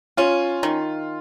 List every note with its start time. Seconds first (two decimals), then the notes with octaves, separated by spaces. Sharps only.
0.17 C#4 F4
0.63 D#3